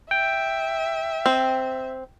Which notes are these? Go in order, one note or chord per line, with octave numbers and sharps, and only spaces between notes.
E5 G5
C4